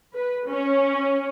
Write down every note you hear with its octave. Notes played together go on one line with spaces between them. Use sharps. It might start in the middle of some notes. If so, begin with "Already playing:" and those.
B4
C#4